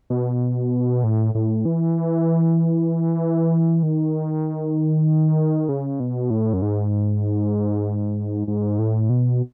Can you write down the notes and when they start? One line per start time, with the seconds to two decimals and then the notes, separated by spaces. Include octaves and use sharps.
0.10 B2
1.04 A2
1.35 A2
1.65 E3
3.83 D#3
5.69 C#3
6.00 B2
6.30 A2
6.53 F#2
6.62 G#2
8.48 G#2
8.79 A2
9.10 B2